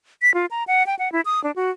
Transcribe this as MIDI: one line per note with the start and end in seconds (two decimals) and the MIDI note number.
0.22 0.34 95
0.34 0.46 65
0.51 0.64 82
0.67 0.85 78
0.87 0.95 79
0.99 1.11 78
1.12 1.21 64
1.25 1.42 87
1.44 1.51 62
1.56 1.71 66